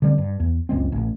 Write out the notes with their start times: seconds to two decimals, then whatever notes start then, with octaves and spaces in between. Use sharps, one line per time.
0.02 D3 G3 C4
0.18 G2
0.40 E2
0.69 F#1 C#2 G#3 C4
0.92 A1